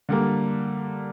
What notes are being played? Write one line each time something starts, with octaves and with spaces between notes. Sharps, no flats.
D3 G3 A#3